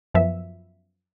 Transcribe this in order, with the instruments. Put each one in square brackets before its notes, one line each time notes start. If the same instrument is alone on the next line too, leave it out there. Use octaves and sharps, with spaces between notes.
[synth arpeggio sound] F#2 F3 B3 E5